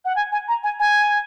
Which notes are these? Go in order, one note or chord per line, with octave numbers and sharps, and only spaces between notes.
F#5
G#5
G#5
A#5
G#5
G#5